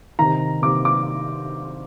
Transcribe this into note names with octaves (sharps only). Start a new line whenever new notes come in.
C3 D#3 A#5
C3 D#3 D6
D6